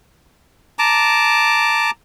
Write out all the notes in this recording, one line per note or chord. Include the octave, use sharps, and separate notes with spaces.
A5 A#5 D6